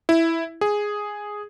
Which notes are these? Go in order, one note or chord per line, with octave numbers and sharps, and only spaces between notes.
E4
G#4